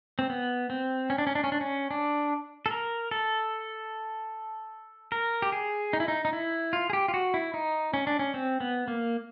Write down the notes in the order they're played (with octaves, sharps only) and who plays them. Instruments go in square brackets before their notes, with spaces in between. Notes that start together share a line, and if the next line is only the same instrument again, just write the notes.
[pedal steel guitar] C4
B3
C4
C#4
D4
C#4
D4
C#4
D4
C#4
D4
A4
A#4
A4
A#4
G4
G#4
D#4
E4
D#4
D#4
E4
F4
G#4
G4
F4
F#4
E4
D#4
C#4
D4
C#4
C4
B3
A#3